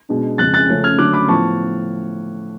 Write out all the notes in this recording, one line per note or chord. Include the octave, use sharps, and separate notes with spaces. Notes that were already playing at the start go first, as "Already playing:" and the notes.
B2 G#3 D4
F2 C#3 G#3 F#6 A6
F#6 A6
C#3 F3 A3 C#4
F6 G#6
D3 F#3 A3 D4 D6 F#6
B5 D6
A2 F3 B3 A5 C#6